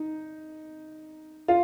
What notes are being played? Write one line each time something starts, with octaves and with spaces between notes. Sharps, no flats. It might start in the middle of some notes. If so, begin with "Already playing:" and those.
Already playing: D#4
F4